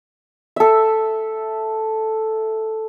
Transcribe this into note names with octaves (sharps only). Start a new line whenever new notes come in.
A4 E5